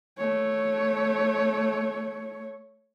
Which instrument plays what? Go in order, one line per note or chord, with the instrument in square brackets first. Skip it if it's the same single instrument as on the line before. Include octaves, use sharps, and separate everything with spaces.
[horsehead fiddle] A3 C#5